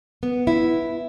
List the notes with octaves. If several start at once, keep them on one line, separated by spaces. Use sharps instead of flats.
B3
E4